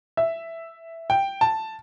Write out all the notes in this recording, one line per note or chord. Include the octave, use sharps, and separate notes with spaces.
E5
G5
A5